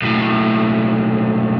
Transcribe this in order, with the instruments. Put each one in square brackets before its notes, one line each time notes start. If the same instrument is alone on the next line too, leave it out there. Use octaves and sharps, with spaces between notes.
[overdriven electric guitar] B1 A2